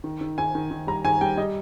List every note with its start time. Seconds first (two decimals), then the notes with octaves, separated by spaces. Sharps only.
0.04 D#3
0.21 D#3
0.38 D#3 G#5
0.55 D#3
0.71 D#3
0.87 G3 A#5
1.04 D#3 G#5
1.21 G3 G5
1.37 G3 D#5